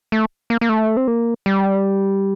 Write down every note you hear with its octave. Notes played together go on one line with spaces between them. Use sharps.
A3
A#3
A#3
A3
C4
A#3
G3